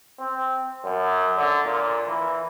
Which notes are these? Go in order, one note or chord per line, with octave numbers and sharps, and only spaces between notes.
C4
F#2
D3
A#2
E3